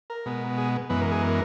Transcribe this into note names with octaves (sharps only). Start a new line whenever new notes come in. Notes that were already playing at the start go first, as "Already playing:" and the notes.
A#4
B2 G#3 B3
G#4
F#2 E3 G#3 B3 B4
A#4
G#4
A#4